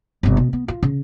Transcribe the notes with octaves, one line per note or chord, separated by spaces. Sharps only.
G1 C3
B2
B3
F4
C#3